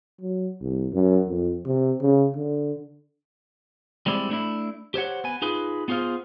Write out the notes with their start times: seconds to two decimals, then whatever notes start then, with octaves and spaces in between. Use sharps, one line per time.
0.21 F#3
0.61 C2
0.93 F#2
1.28 F2
1.65 C3
2.01 C#3
2.36 D3
4.06 G3 G#3 C4 E4 D5
4.30 A3 D4 E4
4.94 G4 C5 C#5 F#5
5.24 B3 G#5
5.42 D#4 F4 G#4 B4
5.88 B3 F4 G#4 C5 F5